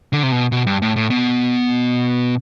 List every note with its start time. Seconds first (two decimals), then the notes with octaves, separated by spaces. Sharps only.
0.13 D3
0.23 C3
0.32 B2
0.52 B2
0.67 G2
0.82 A2
0.96 A2
1.10 B2